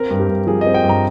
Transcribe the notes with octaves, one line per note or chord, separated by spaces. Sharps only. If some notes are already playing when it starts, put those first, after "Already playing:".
Already playing: C4 A#4
G2
G4
G2
F3 G#4
D#5
C4
G5
G2
A#5